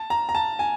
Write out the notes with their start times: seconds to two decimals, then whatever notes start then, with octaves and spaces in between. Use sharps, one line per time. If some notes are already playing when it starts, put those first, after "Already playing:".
Already playing: A5
0.10 A#5
0.29 A#5
0.35 A5
0.59 G#5